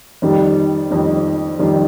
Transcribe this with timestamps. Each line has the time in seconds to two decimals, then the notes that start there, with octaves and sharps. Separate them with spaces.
0.22 F2 D#3 G3
0.90 F2 D#3 G3
1.59 F2 D#3 G3